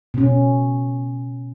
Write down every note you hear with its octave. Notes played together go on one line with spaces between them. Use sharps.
B2 C#4